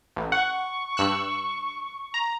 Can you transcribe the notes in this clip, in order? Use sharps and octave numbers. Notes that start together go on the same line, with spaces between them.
A1
F#5 C#6
G2 E6 F#6
A#5